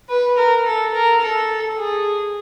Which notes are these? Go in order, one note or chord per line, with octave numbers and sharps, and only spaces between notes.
B4
A#4
A4
A#4
A4
G#4